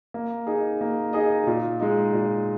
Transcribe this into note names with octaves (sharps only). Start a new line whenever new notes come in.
A#3
D#4 G#4 D#5
A#3
D#4 G#4 D#5
A#2
G#3 D#4
A#2